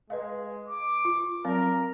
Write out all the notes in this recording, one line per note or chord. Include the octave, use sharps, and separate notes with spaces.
G#3 B4 D#5 F5
D6
F4
F#3 C4 A#4 F5